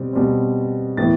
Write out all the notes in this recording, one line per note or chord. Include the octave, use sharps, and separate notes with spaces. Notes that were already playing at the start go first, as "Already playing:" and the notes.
Already playing: B2 G3 C4
B2 G3 C4
A2 E3 B3 A6